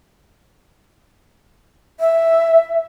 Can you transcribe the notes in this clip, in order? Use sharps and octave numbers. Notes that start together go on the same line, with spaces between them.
E5